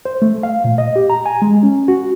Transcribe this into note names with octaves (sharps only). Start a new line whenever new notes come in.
C5
A3
F5
A#2
D#5
G4
A#5
G#5
G#3
C#4
F#4